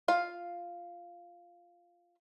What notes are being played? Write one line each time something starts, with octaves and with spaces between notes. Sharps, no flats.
F4 F5